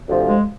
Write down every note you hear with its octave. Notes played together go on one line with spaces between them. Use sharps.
D2 C3 F3
G#3